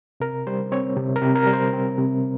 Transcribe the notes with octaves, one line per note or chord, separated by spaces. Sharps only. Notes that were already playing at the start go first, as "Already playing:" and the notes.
C3 A#4
G3 C5
C4 C#5
C3
A#4
C3
A#4
G3
C5
C4
C3